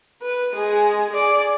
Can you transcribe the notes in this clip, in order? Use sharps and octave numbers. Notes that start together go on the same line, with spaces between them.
B4
G#3 G#4
G#4 D5